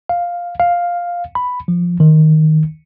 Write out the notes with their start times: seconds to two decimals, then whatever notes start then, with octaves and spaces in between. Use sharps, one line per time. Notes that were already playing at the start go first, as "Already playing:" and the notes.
0.09 F5
0.60 F5
1.35 B5
1.68 F3
2.00 D#3